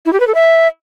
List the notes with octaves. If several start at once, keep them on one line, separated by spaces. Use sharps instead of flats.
E4
G4
B4
A4
E5